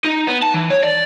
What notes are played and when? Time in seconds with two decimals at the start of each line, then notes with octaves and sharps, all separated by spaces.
0.05 D#4
0.27 B3
0.42 A5
0.54 E3
0.70 C#5
0.83 D5